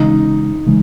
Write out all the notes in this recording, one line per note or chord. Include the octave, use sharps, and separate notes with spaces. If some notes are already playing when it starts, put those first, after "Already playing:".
Already playing: C#3 E3 G#3 C#4 D#4
C#3 E3 G#3